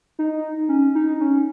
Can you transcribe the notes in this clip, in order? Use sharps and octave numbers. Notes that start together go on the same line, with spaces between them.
D#4
C#4
D#4
C#4